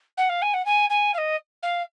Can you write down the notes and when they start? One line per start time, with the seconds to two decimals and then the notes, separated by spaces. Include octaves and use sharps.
0.17 F#5
0.29 F5
0.42 G#5
0.53 F#5
0.65 G#5
0.89 G#5
1.14 F5
1.18 D#5
1.62 F5